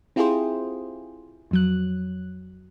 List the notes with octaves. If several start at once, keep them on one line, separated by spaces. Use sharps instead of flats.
C4 E4 F4 G4 G#4 C5
F2 F#3 F#6